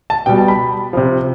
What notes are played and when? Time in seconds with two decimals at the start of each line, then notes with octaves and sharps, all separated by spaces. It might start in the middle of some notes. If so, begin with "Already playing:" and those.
0.10 A5
0.26 B2 G3 G5
0.38 A5
0.48 B5
0.93 C3 F3